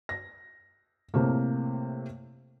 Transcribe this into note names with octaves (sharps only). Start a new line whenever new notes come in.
A#6
A2 C3 A3 A#3